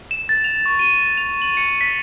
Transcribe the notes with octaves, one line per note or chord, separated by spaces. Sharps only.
E7
A6
F7
C#6
D#7
F7
F#7
C#7
B6